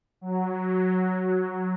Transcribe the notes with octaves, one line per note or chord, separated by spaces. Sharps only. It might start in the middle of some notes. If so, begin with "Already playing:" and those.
F#3